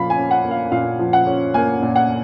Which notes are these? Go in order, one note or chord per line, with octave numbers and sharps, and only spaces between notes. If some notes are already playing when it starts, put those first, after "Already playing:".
Already playing: A#2 F3 A#3 F5 B5
G#5
C#4
F#5
A#3
F5
A#2 F5
F3
F#5
C#4
A#3 G#5
A#2
F#5